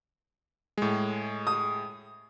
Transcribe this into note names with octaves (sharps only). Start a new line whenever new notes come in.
A2 G#3
D#6